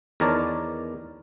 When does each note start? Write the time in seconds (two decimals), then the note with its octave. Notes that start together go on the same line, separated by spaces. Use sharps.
0.20 E2 D#3 A#4 C#5 D5 A5